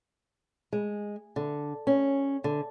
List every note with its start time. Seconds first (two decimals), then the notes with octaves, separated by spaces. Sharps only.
0.73 G#3
1.36 D3
1.87 C#4
2.44 D3